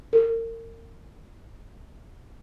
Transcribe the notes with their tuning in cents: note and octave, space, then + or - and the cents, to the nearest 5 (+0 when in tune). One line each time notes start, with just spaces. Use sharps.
A#4 -35